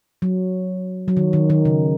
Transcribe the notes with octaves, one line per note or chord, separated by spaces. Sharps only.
F#3
F#3
D#3
D#3
D#3
C#3